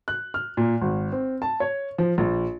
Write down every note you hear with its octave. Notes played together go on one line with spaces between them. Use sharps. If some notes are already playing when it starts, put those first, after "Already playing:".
F#6
F6
A#2
G#1
C4
A5
C#5
F3
A#1